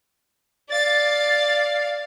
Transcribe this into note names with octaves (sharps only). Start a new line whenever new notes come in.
D5 F5 A6